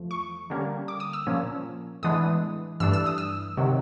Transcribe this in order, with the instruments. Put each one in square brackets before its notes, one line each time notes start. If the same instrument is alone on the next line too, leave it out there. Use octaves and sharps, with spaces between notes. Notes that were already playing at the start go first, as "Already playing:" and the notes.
Already playing: [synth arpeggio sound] E2 F3 A3
C#6
D3 G3 A#3 C#4
D6
D#6
E6
A#2 F3 A#3 C#4
A2 E3 G#3 B3 D4 D#6
G2 E3 A3 D4 E6
E6
D#6
E6
C3 D#3 F#3